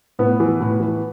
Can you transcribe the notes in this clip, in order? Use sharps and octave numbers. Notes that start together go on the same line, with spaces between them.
A2 B3
E3
A2
E3